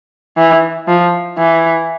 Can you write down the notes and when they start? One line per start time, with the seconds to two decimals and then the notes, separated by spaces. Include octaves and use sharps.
0.37 E3
0.88 F3
1.38 E3